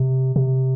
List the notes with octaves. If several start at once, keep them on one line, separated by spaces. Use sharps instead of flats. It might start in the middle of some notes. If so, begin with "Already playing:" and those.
Already playing: C3
C3